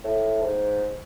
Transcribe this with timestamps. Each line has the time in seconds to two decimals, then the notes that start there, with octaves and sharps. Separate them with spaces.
0.04 A2
0.42 G#2